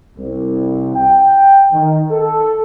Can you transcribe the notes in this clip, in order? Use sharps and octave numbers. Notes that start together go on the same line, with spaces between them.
C2
G5
D#3
A4